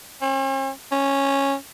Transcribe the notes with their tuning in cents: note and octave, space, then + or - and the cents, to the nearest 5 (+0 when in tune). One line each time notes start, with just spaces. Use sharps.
C#4 -45
C#4 -10